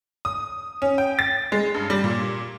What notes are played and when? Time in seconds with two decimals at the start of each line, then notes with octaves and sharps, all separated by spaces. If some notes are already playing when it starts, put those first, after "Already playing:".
0.25 D#6
0.82 C#4
0.98 G5
1.19 A6
1.52 G#3
1.74 G2
1.90 G3
2.04 A#2